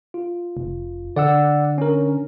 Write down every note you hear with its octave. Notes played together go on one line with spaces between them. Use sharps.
F4
F1
D3 D5 F#5 E6
C#4 A#4